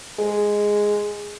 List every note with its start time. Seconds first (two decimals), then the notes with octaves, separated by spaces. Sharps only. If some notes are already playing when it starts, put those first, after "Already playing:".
0.18 G#3